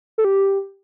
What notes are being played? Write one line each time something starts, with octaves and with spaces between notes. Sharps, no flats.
A4
G4